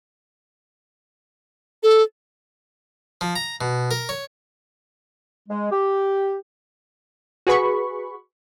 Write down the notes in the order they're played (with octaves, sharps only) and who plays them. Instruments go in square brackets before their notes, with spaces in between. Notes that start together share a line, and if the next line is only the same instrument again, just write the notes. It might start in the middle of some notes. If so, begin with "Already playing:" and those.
[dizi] A4
[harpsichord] F3
A#5
B2
A#4
C#5
[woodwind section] G#3
G4
[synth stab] F#4 G#4 B4 B5 C#6